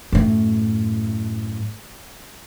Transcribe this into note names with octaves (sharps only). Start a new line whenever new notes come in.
F#2 A2